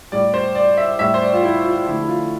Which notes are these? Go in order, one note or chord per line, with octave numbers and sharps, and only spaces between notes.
A2 G3 D5
C5
D5
E5
A2 G3 E5
C5
D5
F4
E4
F4
D3 F3 A3 E4
E4
F4